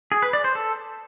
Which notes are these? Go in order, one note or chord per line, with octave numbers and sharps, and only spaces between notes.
G#4
B4
D5
C5
A4